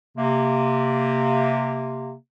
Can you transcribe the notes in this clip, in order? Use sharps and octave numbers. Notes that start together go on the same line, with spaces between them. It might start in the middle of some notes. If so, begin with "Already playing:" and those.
C3 A#3